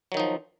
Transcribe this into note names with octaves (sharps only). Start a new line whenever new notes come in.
D#3 F3 F#3 D#4